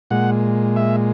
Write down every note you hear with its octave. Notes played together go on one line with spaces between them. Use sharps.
A#2 G#3 F#5
E5